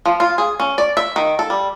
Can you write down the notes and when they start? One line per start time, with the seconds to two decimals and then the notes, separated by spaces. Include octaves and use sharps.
0.06 F3
0.20 F4
0.38 G#4
0.60 C#4
0.78 D5
0.97 E5
1.16 D#3
1.39 A4
1.50 G3